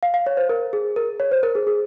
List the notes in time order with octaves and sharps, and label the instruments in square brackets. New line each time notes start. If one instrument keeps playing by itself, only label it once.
[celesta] F5
F5
C#5
C5
A#4
G#4
A#4
C#5
C5
A#4
G#4
G#4